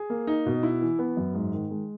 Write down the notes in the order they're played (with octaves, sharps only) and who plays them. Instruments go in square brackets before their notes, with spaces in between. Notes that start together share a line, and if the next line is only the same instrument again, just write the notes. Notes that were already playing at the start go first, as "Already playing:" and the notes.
Already playing: [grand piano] G#4
A#3
D#4
B2
E4
E3
B3
F#2
G#2
D#3
G#3